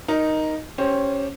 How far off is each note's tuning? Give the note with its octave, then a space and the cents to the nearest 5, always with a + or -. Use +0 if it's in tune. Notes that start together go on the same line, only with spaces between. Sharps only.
D#4 +0 A#4 +0
C#4 +0 G4 +0 C5 +15